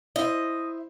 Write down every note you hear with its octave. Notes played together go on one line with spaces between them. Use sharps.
E4 C5 D#5